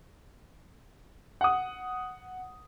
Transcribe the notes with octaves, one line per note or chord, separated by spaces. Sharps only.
F#5 D#6